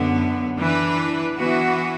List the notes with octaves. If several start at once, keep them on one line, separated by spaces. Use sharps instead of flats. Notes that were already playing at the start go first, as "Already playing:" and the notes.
Already playing: F#2 D3 B3
E3 D4 B4
E3 B3 F#4 B4